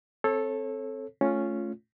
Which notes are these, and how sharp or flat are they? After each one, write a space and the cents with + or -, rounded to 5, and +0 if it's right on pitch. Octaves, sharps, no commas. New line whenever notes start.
C4 +0 A4 +0 C#5 -35
A3 -15 C#4 +0 F4 +0